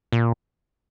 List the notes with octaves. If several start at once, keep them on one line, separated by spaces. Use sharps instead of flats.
A#2